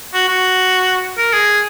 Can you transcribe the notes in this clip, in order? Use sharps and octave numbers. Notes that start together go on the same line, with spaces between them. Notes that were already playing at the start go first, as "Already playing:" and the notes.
F#4
F#4
A#4
G#4